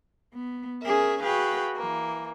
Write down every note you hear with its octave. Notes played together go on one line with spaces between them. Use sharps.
B3
C#4 G#4 A#4 E5
F#4 G#4 B4 F5 G5
E3 A#3